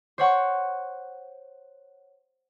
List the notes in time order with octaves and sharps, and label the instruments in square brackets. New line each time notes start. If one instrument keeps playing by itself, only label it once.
[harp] C5 C#5 F#5 C#6